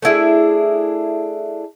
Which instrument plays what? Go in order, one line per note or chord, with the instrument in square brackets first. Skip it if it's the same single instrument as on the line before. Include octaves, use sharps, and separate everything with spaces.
[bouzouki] A3 D4 E4 G#4